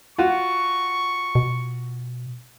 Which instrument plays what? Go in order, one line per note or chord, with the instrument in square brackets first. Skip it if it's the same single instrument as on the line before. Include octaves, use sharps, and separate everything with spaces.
[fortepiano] F4 F#4 [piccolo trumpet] C#6
[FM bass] B2